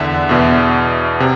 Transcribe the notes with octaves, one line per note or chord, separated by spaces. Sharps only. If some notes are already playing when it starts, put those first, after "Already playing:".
Already playing: E2 D3 E5 F#5
E2 B2
C3